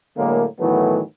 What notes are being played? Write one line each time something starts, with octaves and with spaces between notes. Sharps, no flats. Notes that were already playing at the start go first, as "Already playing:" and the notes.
A2 D3 F#3 G#3 A#3
A2 D#3 E3 F#3 A3 B3